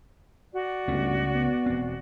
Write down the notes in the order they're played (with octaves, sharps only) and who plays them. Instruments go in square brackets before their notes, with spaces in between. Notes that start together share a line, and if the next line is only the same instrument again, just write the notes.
[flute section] F#4 D5
[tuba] G1 [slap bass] C#2 A3 C#4
[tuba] B3
[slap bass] E1 C4